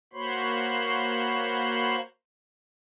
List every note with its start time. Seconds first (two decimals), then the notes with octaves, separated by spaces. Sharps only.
0.13 A#3 F#4 C5 C#5 B5 C6